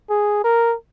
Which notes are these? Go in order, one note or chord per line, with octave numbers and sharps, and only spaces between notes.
G#4
A#4